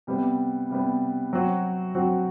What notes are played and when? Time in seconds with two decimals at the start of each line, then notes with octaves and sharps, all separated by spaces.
0.07 C3 G3 B3
0.70 C3 G3 B3
1.33 F#3 C4 F#4
1.95 F#3 C4 F#4